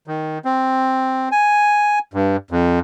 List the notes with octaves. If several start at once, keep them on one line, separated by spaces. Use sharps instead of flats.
D#3
C4
G#5
G2
F2